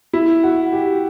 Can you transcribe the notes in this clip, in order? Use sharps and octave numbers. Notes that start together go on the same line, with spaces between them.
E4
F#4
G4